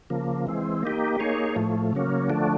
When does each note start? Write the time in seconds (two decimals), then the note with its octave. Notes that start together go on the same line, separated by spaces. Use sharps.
0.10 C#3 F3 A#3
0.47 E3 G#3 C4
0.83 A#3 D#4 G4
1.19 A#3 D#4 G#4 C#5
1.56 A2 F3 A3
1.93 C#3 F#3 A#3 C#4
2.30 D3 F3 A3 D4